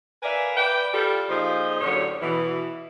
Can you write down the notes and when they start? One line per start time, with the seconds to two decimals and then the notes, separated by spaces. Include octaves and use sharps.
0.23 A#4 B4 D5 E5 F5 G#5
0.56 B4 D5 G5
0.94 G3 F4 A4
1.29 A#2 F3 D#4 G#4 C5
1.81 F#2 A2 D3 G3 C#5
2.22 B2 E3